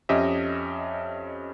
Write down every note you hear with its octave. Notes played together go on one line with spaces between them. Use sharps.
F2 C#4 G4 D#5 E5